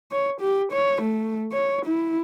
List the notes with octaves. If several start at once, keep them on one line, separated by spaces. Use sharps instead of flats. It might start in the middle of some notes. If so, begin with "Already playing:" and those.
C#5
G4
C#5
A3
C#5
E4